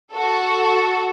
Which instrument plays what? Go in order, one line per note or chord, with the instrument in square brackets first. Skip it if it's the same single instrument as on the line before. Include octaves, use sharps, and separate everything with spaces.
[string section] F#4 A4